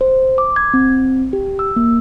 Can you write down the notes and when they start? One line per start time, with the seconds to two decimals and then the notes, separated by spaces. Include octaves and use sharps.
0.01 C5
0.38 D6
0.56 G#6
0.74 C4
1.33 G4
1.59 E6
1.76 A#3